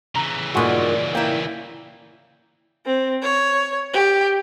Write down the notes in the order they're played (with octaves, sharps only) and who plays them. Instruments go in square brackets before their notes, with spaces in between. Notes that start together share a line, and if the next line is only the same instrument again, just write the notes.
[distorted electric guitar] C#3 E3 [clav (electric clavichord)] A#5
[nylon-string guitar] G2 A#2 D#3 [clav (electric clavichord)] G#3 F#4 [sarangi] D5
[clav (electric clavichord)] A#3 [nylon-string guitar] E4 G5
[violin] C4
C#5
G4